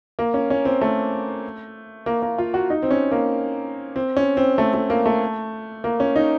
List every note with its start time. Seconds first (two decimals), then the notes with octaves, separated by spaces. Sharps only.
0.19 A#3
0.34 C#4
0.50 C#4
0.65 C4
0.81 A3
2.06 A#3
2.22 A#3
2.38 F4
2.54 F#4
2.70 D#4
2.83 C4
2.91 C#4
3.11 A#3
3.96 C4
4.17 C#4
4.37 C4
4.58 A3
4.74 A3
4.90 A#3
5.06 A3
5.84 A#3
6.00 C#4
6.16 D#4